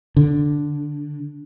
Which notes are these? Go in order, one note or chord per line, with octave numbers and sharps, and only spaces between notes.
D3